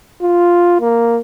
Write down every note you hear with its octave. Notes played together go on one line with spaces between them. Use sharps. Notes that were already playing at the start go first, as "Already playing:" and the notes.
F4
A#3